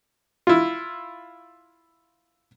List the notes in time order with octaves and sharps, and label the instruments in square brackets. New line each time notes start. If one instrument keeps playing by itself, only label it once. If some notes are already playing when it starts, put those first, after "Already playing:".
[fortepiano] E4 F4